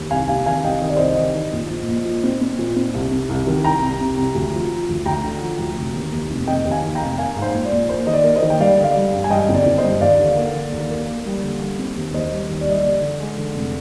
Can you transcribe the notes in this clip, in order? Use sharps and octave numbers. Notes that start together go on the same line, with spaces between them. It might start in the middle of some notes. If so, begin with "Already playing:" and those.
Already playing: D#2
C2 F5 G#5
C3 F5 G#5
D#3 F5 G#5
C2 D#5 G5
D#3 D#5
D5
C2 C5 D#5
D#3
D#3
A#1
A#1
A#1
A#2
C4
C4
A#2
C4
C2
C3
C2
D#3
C2 G5 A#5
C2
C3
C2
D2
F3
F3
D2
D2 G5 A#5
D3
F3
D2
F1
D#2
D#2
F1
F1 D#5 G5
D#2
F5 G#5
D#3
G5 A#5
F1
A#3 F5 G#5
G#2
C5
A#1
D5
A#1
A#3 C5
D#3 D#5
D5
A#3
C5 D#5
D#3
G5
G3 D5 F5
D3
D5 F5
G3
G2
G#5
G2 D#5 G5
G1
D5
G1
C5 D#5
G2
D#2 D5 F5
D3
A#3
D3
D#2
A#3
A#3
G3
D3
G3
C4
D#2
D#2 C5 D#5
G3
D#2
D5
G3 D#5
D5
D3
D3
G#3
D3
F1